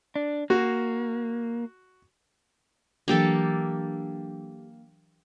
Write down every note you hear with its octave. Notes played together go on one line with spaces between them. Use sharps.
D4
A#3 F#4
E3 F#3 A#3 D4 G4 A4